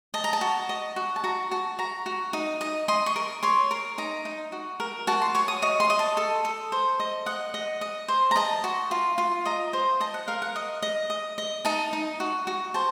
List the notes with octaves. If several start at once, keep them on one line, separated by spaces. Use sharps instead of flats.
D#5 A5
A#5
A5
F#4
D#5
F#4
A5
F#4 A#5
F#4 A5
F#4 A#5
F#4
D#4
D#5
D#5 C6
C#6
A#4
C#5 C6
A#4
D#4 A#5
D#4
F#4
A#4
F#4 A5
C6
C#5 C#6
D#6
D#5 C#6
C6
D#5
A5
A4
A4
C5
D#5
D#5 F#5
D#5
D#5
C5
A#5
D#5 A5
F#4
F4
F4
D#5 A#5
C5
D#5 A5
F#5
A#4 F5
F#5
D#5
D#5
D#5
D#5
D#4 A5
D#4
F#4
F#4
C5 A5